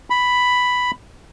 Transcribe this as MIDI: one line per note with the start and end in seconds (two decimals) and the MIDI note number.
0.10 0.91 83